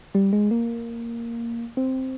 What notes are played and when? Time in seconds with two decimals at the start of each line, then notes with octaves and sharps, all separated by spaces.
0.15 G3
0.33 G#3
0.51 A#3
1.77 C4